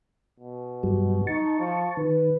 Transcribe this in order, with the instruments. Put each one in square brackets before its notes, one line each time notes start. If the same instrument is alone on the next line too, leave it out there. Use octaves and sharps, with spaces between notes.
[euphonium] B2
[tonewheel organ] G2 F#3 G3
[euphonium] D#4 [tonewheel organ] A5 C#6
[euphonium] F3
[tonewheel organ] D#3 [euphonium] B4